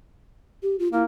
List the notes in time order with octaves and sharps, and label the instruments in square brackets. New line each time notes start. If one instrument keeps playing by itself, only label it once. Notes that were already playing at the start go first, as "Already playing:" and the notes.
[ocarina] G4
F4
[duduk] A#3 [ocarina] E4